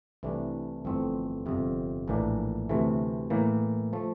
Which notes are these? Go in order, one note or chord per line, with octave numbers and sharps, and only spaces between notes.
C2 C3 E3 A3 D4
G1 F2 E3 A3 C4
G1 F2 C3
A#1 A2 E3 A#3 D4
D2 C3 E3 A3
A2 E3 A#3
F3 A3